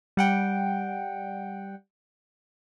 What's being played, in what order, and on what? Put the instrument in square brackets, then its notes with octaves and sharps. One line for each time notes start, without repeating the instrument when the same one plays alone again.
[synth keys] G3 F#5 G5